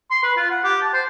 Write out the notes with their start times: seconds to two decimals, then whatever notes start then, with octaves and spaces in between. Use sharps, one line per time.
0.11 C6
0.23 B4
0.37 F4
0.50 F#5
0.64 G4
0.82 A5
0.93 C5